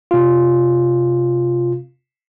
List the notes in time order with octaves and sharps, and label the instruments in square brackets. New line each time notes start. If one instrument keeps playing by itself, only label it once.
[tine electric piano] C3 F4